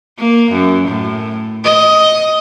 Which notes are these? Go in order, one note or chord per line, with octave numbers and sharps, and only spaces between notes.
A#3
F#2
A2
D#5